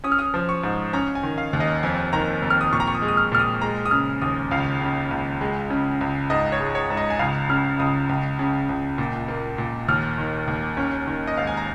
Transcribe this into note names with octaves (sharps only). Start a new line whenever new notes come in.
C#4 D#6
F6
D#6
F3
C#6
G#2
C#4 A#5
G#5
D#3
F5
D#2
D#5
F2 G#5
D#3 A#5
F2
F6
D#6
A#2 C#6
A#5
C#6
D#6
G#3
D#6
F6
A#2 F6
D#6
G#3 A#5
D#6
C#3 F6
D#2 D#6
C#2 F5
C#3
C#2
G#3
C#3
C#2
G#2 D#5
C#5
G#3
C#5
G#2
D#5
G#5
C#2 F5
C#3 F6
C#2 D#6
C#2
C#3
C#2
A#2
A#3
A#2
D#2 F6
D#3
D#2
C#4
D#3
D#5
G#2 F5
G#5
A#5